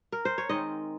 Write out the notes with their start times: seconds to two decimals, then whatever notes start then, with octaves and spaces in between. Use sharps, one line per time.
0.12 A#4
0.25 C5
0.38 C#5
0.49 D#3 G#3 C4 D#5